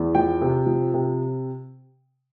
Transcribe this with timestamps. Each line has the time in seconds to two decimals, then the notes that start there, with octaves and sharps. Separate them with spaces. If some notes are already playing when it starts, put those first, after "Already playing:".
Already playing: E2
0.15 F3 G5
0.41 C3
0.66 F3
0.94 C3